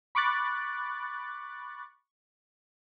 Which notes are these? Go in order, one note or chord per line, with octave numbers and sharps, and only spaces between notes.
B5 C#6 D6 F#6 A6